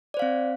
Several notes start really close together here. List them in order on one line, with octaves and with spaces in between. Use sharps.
D5 C5 F5 C4